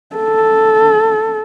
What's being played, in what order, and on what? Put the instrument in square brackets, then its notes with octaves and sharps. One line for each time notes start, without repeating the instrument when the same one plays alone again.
[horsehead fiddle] A4